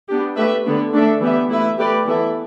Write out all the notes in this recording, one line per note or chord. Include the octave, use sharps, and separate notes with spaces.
B3 D4 G4
A3 G4 B4 E5
D3 B3 D4
A3 D4 A4 E5
E3 B3 G4 E5
A3 E4 B4 E5
A3 G4 B4 D5
E3 B3 E4 A4 E5